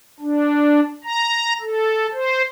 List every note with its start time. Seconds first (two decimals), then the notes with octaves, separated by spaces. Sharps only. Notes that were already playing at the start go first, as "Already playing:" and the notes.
0.20 D4
1.04 A#5
1.61 A4
2.13 C5